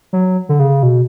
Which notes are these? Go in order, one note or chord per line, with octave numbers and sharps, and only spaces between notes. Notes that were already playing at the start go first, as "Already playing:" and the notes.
F#3
D3
C#3
B2